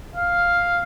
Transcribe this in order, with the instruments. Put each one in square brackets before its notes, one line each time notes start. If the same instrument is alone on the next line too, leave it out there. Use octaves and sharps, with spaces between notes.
[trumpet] F5